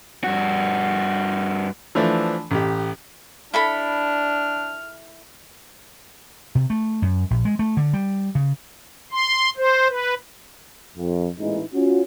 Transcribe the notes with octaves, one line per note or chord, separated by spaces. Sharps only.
G2 F#4
E3 F3 A3 D4
A1 G4
D4 E4 A4 B5 F6
C3
A3
F#2
A#1
G#3
A3
D3
G3
C#3
C6
C5
B4
F2
A1 A#2 E3 G#3 D#4
C#4 F4 F#4